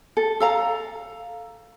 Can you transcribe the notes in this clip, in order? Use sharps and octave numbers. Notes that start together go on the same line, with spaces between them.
A4
A4 F5 A#5